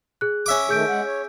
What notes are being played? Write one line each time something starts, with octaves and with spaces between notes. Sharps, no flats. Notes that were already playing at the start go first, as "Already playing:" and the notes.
G#4 F#6
C#4 E5 D6
D#3 A3 G#4 G6 D7
G#3 F#5
C#5